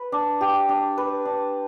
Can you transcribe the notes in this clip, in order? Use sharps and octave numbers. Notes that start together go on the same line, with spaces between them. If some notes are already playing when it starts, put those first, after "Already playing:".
Already playing: B4
D4
G4
D4
B4
D4